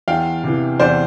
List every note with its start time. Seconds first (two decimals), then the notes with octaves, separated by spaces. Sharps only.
0.08 E2 F5 G5
0.44 C3 E3
0.80 E2 C5 D5